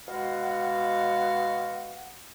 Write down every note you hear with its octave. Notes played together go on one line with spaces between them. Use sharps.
B2 G#3 F#4 F5 F#5